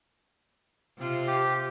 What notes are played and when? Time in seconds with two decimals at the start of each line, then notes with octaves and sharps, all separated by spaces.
0.98 C3 F4
1.27 G4